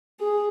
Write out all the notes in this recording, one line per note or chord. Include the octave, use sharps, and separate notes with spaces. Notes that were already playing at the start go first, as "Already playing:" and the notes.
G#4